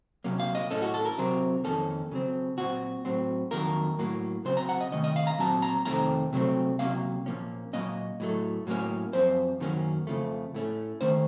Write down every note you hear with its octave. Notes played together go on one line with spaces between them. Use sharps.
C3 F#3 A#3 C#4
F5
D#5
A2 A3 C#4 A4
F#4
A4
A#4
C3 F#3 C4
F2 D#3 A#3 C#4 A4
C#3 F#3 C4
A#2 F#3 C4 F#4
A2 F#3 C4
F2 D#3 F#3 A#3 A#4
A2 F#3 A#3
C#3 F#3 C4 C5
A#5
F#5
D#5
C3 D#3 A3 C#4 D#5
D#5
F5
A#5
A#2 F#3 C4 A5
A#5
F2 C3 D#3 A3 C4 A#5
C3 F#3 A3 C4
C3 F#3 A#3 C#4 F5
A#2 F3 A#3 C#4
A#2 F#3 A#3 C#4 D#5
A2 F#3 A3
A2 F#3 A#3 C#4
F#2 F3 C4 C5
F#2 D#3 F#3 A#3 C#4
F2 C#3 F3 A3
A2 A3 C#4
D#3 A3 C#4 C5